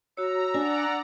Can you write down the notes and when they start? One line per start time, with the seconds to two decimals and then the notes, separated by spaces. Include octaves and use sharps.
0.17 F#4 C#5 A#5 E6
0.54 D4 D5 F#5 G#5 A#5